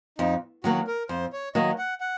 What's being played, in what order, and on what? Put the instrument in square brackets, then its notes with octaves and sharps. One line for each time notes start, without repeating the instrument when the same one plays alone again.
[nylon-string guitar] F2 [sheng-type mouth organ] D#4
[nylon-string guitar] D#3 F#3 A#3 [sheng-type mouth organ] F#4
[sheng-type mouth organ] A#4
[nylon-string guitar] F2 [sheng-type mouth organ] C5
[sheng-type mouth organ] C#5
[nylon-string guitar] D#3 F#3 A#3 [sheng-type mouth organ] D#5
[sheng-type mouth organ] F#5
F#5